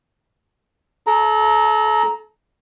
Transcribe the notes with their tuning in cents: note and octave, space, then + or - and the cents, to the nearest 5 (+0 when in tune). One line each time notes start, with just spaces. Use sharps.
A4 -35 A#5 +0